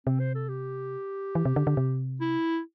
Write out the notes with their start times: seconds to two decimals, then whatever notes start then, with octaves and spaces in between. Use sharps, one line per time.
0.06 C3 C4
0.20 C5
0.35 A4
0.48 G4
1.35 E3
1.45 C3
1.56 D3
1.67 D3
1.77 C3
2.21 E4